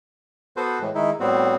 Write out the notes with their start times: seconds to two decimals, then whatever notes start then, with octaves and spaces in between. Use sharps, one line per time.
0.57 B3 F#4 A4 B4 C5
0.81 A2 E3 G#3
0.95 D#3 G#3 D#4 E4
1.20 A2 G3 B3 C4 F#4